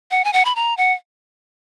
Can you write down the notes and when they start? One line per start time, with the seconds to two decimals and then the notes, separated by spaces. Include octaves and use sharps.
0.11 F#5
0.24 G#5
0.33 F#5
0.45 B5
0.56 A#5
0.77 F#5